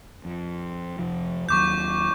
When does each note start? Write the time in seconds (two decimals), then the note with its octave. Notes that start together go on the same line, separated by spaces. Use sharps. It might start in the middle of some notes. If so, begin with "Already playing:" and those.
0.25 F2
0.99 F1 F3
1.49 D#2 F#3 C#6 D6 G6